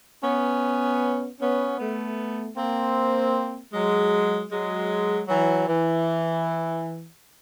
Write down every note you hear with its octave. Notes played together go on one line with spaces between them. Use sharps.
B3 C#4
B3 C#4
A3 B3
A#3 C4
F#3 G#3
F#3 G#3
E3 F#3
E3